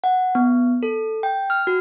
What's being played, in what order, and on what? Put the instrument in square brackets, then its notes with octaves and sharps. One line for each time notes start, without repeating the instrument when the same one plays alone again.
[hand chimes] F#5
B3
A4
G5
F6
F#4